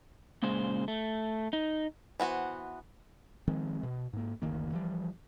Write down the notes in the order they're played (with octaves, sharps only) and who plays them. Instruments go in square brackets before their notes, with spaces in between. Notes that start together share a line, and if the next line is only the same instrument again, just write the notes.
[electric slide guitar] A#2 C#3 G#3 C5
A3
D#4
[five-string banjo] E3 B3 F#4 C5
[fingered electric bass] D#3 F3 G#3 C4
B2
G#2 A#3
F#1 D2 D#3 A#3
E3 F3 G3